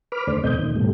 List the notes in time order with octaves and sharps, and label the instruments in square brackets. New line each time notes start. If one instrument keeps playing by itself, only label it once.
[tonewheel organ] B4 B5 D6 F6
D#2 D3 A3 C5 D5
D#2 B2 A3 C4 D#5 G6
A#2 D#3
G#2 B2 G3 A3